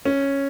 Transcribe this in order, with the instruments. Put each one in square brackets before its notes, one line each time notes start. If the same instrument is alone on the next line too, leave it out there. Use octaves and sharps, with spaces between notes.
[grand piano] C#4